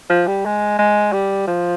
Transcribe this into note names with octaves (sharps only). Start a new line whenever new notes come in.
F3
G3
G#3
G#3
G3
F3